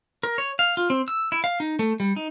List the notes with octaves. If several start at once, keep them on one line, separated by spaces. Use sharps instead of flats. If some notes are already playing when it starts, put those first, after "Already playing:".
A#4
C#5
F5
F4
C4
E6
E4
F5
D#4
A3
G3
D#4